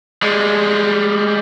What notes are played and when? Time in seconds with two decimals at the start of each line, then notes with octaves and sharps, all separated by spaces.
0.23 G3 G#3